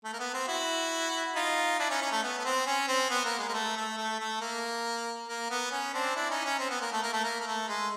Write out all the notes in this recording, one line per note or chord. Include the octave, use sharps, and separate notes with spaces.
A3
A#3
B3
C4
E4 F#4
D#4 F4
D4 E4
C#4 D#4
C#4
A3
B3
B3
C4
C#4
C4
B3
A#3
G#3
A#3
A3
A3
A3
A3
A#3
A#3
B3
C#4
C4 D4
D4 E4
C#4 D#4
C#4
C4
B3
A#3
A3
A#3
A3
A#3
A#3
A3
G#3